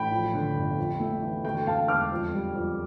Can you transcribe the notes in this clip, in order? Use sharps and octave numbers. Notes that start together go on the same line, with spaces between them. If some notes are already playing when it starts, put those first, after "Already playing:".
Already playing: A1 G5 B5
F3
D3
G1
F2
A3
E3
D2 G5
D2 F5 A5
E1 D6 F6
F2
G3
F2